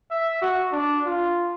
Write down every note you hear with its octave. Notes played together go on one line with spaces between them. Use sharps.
E5
F#4
D4
F4